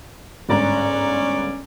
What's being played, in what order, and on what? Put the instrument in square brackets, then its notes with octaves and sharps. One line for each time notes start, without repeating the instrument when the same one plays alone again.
[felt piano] G1 G#2 A#5 [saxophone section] C#4 D5